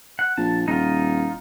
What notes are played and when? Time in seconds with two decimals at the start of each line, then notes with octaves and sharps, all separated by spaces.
0.19 F#5
0.37 A#1 A5
0.68 D#1 D#4 F4